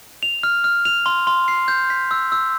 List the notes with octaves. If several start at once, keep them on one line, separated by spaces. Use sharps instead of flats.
F7
F6
F6
F7
C6
C6
C7
G6
B6
E6
E6